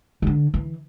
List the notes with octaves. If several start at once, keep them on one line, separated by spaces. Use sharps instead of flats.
E3
D3
E3